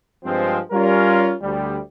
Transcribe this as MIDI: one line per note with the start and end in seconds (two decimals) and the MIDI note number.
0.24 0.58 43
0.24 0.58 53
0.24 0.58 56
0.24 0.58 60
0.71 1.33 55
0.71 1.33 61
0.71 1.33 65
0.71 1.33 70
1.41 1.78 38
1.41 1.78 55